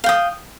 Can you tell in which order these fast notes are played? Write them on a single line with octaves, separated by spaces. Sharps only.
F5 G5 D#6